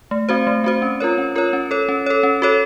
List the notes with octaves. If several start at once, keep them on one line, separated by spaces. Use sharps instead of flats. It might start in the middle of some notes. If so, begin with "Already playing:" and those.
A3
C4 F#4 C5
A3
C4 F#4 C5
C#4
F4 A#4 C#5
C#4
F4 A#4 C#5
C#4
A4 C#5
C#4
A4 C#5
C#4
F#4 A4 C#5